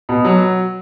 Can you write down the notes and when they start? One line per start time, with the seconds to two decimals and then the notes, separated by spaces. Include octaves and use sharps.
0.09 B2
0.25 F#3